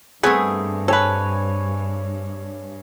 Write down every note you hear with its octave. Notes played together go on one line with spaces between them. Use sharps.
G2 A3 B3 C4 G#4 B4 G#5
A4 B4 C#5 G#5